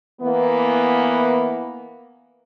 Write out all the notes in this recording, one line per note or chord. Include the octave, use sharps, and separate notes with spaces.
E3 A#3 B3